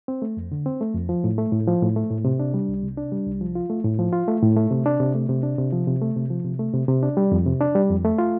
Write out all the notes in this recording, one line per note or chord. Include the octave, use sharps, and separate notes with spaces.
C4
A3
F2
D3
C4
A3
F2
F3
A2
A3
A2
F3
A2
A3
A2
C3
D4
G3
C2
C3
D4
G3
C2
F3
F4
A3
A2
F3
F4
A3
A2
A3
C3
D4
C3
A3
C3
D4
C3
F3
C3
A3
C3
F3
C3
A3
C3
C3
D4
G3
F2
C3
D4
G3
F2
A3
F4